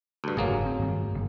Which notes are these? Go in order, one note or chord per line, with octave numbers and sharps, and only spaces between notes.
D2 G2
F#1 G#2 F#3 A#3 G#4
C4
G2 D#3 A3
F#1